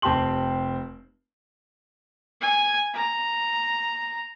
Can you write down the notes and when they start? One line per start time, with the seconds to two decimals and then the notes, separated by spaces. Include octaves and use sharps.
0.02 F1 C4 G4 A5 C6 F#7
2.41 G#5
2.94 A#5